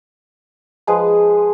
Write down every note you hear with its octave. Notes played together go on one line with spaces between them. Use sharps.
F3 G#3 G#4 B4